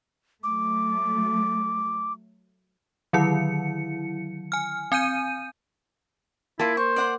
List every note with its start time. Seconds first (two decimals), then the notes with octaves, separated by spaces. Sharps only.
0.43 F#3 A3 D6
3.13 D3 D#3 F#3 E4 C#7
4.52 G#5 F6
4.92 C4 G#5 G6 D#7
6.59 A#3 E4 F4 A5
6.77 C5 C#6
6.96 D5 F#5 C6